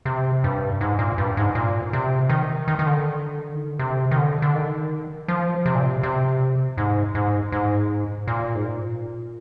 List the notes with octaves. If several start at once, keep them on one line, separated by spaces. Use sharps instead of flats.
C3
G2
G#2
A#2
G2
G#2
A#2
C3
D#3
D#3
D#3
D3
D#3
D3
C3
D#3
D3
D3
D#3
F3
C3
A#2
C3
C3
G#2
G#2
G#2
A#2
G#2
A#2